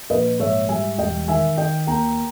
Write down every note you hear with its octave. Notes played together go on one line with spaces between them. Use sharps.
A#1 B4 D#5
G#2 C#5 E5
G3 E5 G#5
E1 D#5 G5
D#3 E5 G#5
D#3 D#5 G5
D#2 G5 A#5